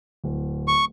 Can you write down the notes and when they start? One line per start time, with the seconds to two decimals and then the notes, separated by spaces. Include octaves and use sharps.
0.24 D1
0.68 C#6